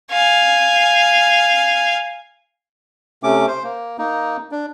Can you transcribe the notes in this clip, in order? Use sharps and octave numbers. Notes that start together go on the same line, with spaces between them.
F5 G#5
C3 A3 C#4 D6
C5
A#3
A#3 D#4
D4